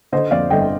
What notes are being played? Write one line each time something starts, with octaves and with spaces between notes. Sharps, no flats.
D3 C5 D#5
F2 D5 F5
G1 D#5 G5